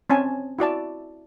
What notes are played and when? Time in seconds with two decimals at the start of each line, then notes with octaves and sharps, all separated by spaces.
0.10 C4 C#4 G#5 A5
0.59 E4 F#4 D5 A5